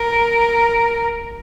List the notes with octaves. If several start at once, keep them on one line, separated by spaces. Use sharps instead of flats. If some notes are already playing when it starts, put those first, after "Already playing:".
Already playing: A#4